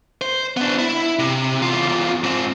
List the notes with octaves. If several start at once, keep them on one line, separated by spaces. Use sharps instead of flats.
C5
B3 D4
E4
C3
E2 F4
G#2 C4